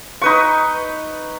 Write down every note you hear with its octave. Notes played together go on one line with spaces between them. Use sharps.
D#4 B4 C#6